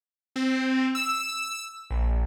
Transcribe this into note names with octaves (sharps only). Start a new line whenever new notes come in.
C4
E6
A#1